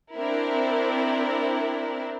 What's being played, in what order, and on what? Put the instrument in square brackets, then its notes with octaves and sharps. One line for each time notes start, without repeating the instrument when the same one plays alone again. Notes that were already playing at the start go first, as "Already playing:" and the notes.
[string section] C4 D4 E4 A#4